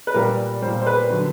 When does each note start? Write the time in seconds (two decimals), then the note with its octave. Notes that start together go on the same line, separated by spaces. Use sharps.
0.07 B4
0.14 A#2 G3 A#4
0.62 G3 C5
0.67 A#2
0.82 C5
0.86 B4
1.10 D3 F#3